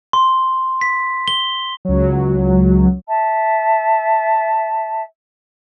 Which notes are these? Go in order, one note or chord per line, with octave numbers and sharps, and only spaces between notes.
C6
B6
G7
C#2 F#3
E5 A5